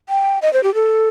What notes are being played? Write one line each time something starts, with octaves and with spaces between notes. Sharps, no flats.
G5
D#5
C5
G4
A4